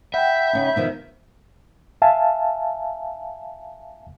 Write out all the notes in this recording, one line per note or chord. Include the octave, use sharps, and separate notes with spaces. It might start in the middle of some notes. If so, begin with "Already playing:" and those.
E5 F#5 G5 B5 G6
C#3 C#4 D#4
B2 D#3 F3
E5 F5 G#5 A5